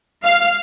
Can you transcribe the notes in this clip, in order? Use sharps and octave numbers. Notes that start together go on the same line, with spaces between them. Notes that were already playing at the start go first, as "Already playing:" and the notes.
F5